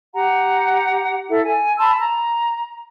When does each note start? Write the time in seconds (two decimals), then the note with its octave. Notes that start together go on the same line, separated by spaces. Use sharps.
0.14 G4 F#5 A#5
1.29 E4 A4 E5
1.43 G#5
1.78 A5 B5 C6 E6
2.00 A#5